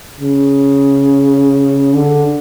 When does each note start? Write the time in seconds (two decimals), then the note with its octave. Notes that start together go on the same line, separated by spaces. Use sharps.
0.20 C#3
1.93 D3